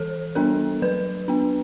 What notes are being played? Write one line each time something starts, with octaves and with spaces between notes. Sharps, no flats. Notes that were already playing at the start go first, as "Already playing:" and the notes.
Already playing: E3 A4
G3 B3 D4 A#4
F#3 B4
B3 D4